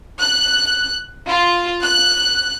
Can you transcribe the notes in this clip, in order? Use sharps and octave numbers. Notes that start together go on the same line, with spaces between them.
F#6
F4
F#6